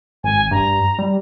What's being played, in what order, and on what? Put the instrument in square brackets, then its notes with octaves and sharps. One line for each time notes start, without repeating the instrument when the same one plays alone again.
[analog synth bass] G#1 [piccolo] G#5
[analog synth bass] G2 [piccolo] A#5
[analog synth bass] G3